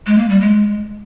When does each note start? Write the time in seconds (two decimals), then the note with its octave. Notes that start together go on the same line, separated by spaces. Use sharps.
0.07 G#3
0.18 A#3
0.29 G3
0.41 G#3